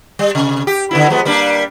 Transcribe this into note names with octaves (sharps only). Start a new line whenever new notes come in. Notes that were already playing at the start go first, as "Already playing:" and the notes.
G3
C3
G4
D3 B3 E4
F3 G#3 B3
G3 A#3 D4